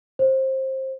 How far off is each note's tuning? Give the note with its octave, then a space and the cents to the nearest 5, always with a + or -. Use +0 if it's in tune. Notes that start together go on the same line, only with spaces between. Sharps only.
C5 +20